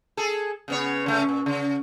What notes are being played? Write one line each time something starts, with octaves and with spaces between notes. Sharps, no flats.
G#4 A4
C#3 B3 C#5
C#3 A3 C#4
A#2
C#3